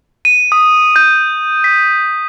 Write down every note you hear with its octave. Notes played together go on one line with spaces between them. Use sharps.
D#7
D#6
G6
B6